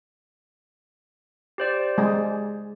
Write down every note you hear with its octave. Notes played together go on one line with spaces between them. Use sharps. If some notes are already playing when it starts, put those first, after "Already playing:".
G4 C5 D5
G#3 G#4